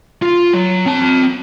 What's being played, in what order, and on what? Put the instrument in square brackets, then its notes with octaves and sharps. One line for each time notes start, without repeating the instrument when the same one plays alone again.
[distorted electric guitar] F4
F#3
C4 A5